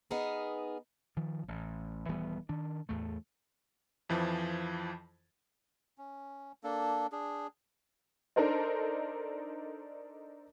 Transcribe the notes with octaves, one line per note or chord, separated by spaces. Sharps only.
B3 D#4 G#4 A#4
D#3 F3
A1
D#1 E3 G3 B3
D#3 D4
E2 A2 A3
F2 E3 F3
C#4
A#3 D4 A4
D4 G#4
D4 D#4 A4 A#4 C5 D#5